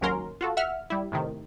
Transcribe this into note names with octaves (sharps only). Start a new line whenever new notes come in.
G#1 D#2 F#3 C#4 A#4 C6
F4 F#4 A4
E5 F#5 F6
G3 E4
A2 C3 D#3